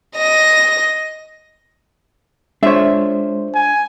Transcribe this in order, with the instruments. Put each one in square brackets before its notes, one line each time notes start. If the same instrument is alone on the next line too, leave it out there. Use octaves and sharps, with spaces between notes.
[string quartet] D#5 A#6
[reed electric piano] G#3 C5 [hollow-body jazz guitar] D4 F4 C#5 [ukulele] E5
[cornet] G#5